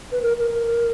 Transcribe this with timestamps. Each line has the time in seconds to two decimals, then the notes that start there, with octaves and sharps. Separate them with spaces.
0.12 B4
0.22 A#4
0.37 A#4